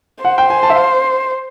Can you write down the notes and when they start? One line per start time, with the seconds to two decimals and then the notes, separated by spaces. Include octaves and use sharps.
0.24 C5 F#5
0.38 G5
0.50 G#5
0.63 A5
0.70 E5
0.75 F5